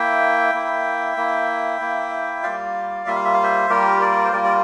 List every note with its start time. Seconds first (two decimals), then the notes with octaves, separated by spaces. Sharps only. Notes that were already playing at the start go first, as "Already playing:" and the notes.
Already playing: A#3 E4 E5 G5
0.54 A#3 E4
1.17 A#3 E4
1.80 A#3 E4
2.43 G3 A#3 F4 D5 F5
3.07 G3 A#3 F4 E5
3.16 F5
3.25 E5
3.34 F5
3.43 C5 E5
3.70 G3 A#3 F4 G4 A#4
4.01 A#4 D5
4.24 C5
4.33 G3 A#3 F4 A#4 D5
4.44 D5